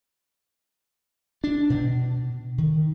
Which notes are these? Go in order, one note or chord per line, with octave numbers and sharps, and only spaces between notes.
D4
B2
D#3